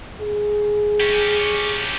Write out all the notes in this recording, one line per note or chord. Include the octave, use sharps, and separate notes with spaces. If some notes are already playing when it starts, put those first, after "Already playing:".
G#4
C#4 G4